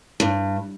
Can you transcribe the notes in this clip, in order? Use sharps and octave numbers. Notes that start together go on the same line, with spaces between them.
G2